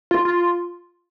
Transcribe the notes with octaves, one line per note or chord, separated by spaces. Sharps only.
F4
F4